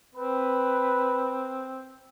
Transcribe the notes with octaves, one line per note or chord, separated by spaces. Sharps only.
C4 B4